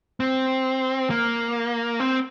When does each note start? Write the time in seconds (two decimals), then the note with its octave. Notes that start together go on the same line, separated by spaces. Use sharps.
0.20 C4
1.10 A#3
2.00 C4